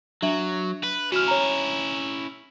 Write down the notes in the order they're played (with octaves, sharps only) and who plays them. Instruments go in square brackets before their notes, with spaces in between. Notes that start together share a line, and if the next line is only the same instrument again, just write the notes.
[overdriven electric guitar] F#3 [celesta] D4 E5 F#7
[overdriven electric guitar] B4
[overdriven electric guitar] C#4 E4 [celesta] F#4 F6
[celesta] C#5 A#5